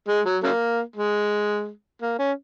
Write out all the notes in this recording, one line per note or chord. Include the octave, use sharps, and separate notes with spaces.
G#3
F#3
C#3 F#3 A#3
G#3
A#3
C#4